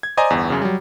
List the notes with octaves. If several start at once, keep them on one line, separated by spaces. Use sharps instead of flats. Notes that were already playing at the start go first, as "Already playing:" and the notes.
G#6
C5 D5 D#5 G#5 A#5
G1 E2
F#2 C#3
F#3 G3